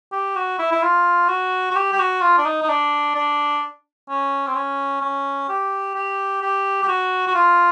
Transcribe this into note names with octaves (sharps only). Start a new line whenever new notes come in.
G4
F#4
E4
E4
F4
F#4
F#4
G4
G4
F#4
F4
D4
D#4
D#4
D4
D4
C#4
C4
C#4
C#4
G4
G4
G4
G4
F#4
F#4
F4